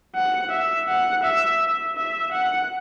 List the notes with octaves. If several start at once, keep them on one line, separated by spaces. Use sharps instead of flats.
F#5
E5
F#5
E5
E5
E5
F#5